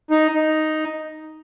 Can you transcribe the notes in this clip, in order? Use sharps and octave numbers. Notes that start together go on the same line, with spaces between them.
D#4
D#4